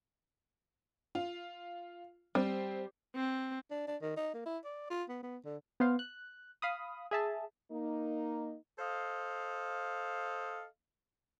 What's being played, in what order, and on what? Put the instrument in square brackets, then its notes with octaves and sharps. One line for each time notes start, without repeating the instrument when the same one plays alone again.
[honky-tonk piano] F4
[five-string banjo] G3 [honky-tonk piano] C4
[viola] C4
[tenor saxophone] D4
D4
D#3
D#4
A#3
E4
D5
F4
B3
B3
D3
[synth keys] B3 C5 F5
F#6
F5 B5 D#6
G#4 E5 A5
[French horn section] A#3 D#4
[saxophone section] A4 C5 D#5 F5